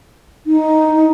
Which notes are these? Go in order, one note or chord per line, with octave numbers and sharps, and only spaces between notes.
D#4